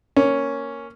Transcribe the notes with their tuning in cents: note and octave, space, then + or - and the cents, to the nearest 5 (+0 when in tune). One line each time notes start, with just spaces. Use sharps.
A#3 +0 C#4 +0